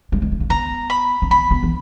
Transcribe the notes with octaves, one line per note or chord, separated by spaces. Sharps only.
G3
G#3
A3
A#3
B3 A#5
B5
A#3
B3 B5
B3
E3